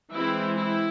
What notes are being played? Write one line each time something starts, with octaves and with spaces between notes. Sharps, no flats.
E3 G#3 C4 E4
E4